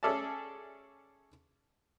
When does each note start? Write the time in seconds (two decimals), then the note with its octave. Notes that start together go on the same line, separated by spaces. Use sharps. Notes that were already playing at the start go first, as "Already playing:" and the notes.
0.03 C#4 G#4 A4 D5 E5 A5